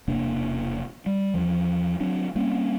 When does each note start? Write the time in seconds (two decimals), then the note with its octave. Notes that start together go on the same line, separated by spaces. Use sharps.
0.08 E1 C3 A#3 D4
1.06 G3
1.34 E2 F3
2.00 F#3 C4 D4
2.35 G3 A#3 C4 C#4